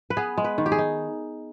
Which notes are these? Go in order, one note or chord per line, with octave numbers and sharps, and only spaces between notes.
B4
B3 G#4
G#3
B4
D#3
G4
G#4
D#4